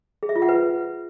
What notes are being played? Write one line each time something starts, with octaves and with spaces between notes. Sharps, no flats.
G#4
E5
F4
F#5
B4